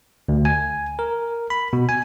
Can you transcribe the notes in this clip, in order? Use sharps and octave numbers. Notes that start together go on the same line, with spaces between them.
D2
G#5
A#4
B5
B2
G#5